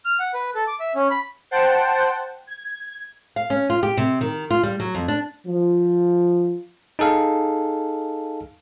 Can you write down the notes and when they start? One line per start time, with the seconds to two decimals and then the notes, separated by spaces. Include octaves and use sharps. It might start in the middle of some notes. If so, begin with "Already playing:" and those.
0.05 F6
0.20 F#5
0.34 B4
0.55 A4
0.67 D6
0.80 E5
0.95 C#4
1.10 B5
1.51 C5 F#5 G5 A5
2.47 G#6
3.36 F5
3.50 C#4
3.70 F4
3.83 G4
3.97 C3
4.21 D#3
4.51 F4
4.63 G3
4.80 F#3
4.95 F2
5.08 D4
5.47 F3
6.99 D#4 G#4 A4 F5